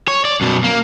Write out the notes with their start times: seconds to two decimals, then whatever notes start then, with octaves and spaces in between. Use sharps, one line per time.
0.08 C#5
0.25 D5
0.41 F#2 B2
0.64 A#3